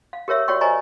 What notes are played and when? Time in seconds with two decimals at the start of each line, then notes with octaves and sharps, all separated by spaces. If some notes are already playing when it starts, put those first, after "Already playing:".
0.13 F5
0.28 G4 A#4 C#5 E5
0.48 F#4 C#5 D5 G5 C#6
0.61 C5 C#5 D#5 G#5 A#5 C#6